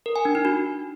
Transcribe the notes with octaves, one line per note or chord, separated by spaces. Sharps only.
A#4
G#5
D4
D#4
F#4